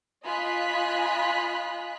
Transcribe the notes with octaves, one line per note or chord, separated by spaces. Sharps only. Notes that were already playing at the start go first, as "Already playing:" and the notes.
F4 D#5 G#5 B5 F#6 B6